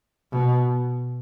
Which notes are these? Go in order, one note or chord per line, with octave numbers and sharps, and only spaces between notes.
B2